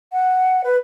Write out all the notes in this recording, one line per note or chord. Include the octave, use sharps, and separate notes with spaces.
F#5
B4